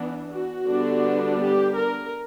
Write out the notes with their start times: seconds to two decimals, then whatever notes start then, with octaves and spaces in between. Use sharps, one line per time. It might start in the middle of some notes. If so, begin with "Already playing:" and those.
Already playing: E3 B3 D4
0.30 F#4
0.67 D3 G3 B3 D4
1.41 G4
1.77 A#4